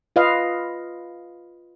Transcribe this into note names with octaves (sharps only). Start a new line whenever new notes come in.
F4 B4 D#5 F5